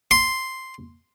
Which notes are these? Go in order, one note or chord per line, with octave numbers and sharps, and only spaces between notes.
C6